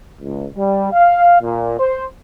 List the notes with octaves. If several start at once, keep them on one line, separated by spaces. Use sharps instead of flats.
C#2
G3
F5
A#2
C5